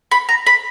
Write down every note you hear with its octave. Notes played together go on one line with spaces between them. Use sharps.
B5
A#5
B5